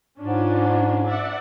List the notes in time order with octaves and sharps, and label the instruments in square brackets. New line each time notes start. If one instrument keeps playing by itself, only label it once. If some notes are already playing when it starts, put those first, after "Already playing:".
[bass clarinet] G#2 [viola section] C#4 D4 F4
[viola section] D5 E5 F#5